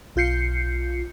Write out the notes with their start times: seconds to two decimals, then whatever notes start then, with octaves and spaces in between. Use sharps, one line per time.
0.16 B1 F4 G6 C7 C#7